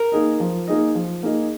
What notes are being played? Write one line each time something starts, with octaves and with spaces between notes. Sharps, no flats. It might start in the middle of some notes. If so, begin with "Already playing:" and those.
Already playing: A#4
A#3 D#4 G#4 D#5
F3
A#3 D#4 G#4 D#5
F3
A#3 D#4 G#4 D#5